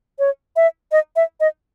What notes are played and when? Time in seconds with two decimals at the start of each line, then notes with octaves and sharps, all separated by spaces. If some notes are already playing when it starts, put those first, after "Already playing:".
0.19 C#5
0.56 E5
0.92 D#5
1.16 E5
1.40 D#5